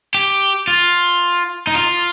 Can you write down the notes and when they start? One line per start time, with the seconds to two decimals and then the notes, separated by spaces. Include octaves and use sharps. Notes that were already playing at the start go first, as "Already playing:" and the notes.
0.14 G4
0.67 F4
1.67 D#4
1.75 F4